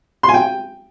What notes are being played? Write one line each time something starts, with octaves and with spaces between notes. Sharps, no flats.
C6
G#5
G5